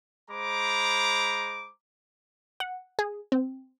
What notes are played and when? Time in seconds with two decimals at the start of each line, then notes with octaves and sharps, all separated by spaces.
0.31 G#3 C5 A#5 B5 D6
2.60 F#5
2.99 G#4
3.32 C4